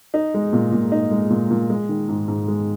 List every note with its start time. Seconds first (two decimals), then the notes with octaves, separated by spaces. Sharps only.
0.14 D#4
0.34 G#3
0.53 A#2
0.72 A#2
0.92 D#4
1.11 G#3
1.30 A#2
1.51 A#2
1.70 G#3
1.89 D#3
2.09 G#2
2.28 G#2
2.48 G#3